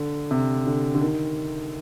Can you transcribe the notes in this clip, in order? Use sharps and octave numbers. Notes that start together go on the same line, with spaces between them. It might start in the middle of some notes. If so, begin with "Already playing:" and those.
Already playing: D3
C3
D3
D3
D#3